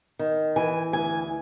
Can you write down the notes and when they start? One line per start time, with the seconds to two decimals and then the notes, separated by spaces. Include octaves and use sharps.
0.19 D#3
0.56 E3 G#5
0.93 D2 G#5